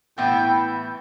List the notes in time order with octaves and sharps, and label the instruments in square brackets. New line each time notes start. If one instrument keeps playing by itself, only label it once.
[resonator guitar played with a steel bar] A2 E3 B3 E4 [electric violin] G5